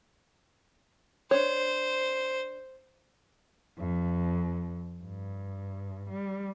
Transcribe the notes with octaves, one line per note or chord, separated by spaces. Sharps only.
D4 C5 C#5
F2
G2
G3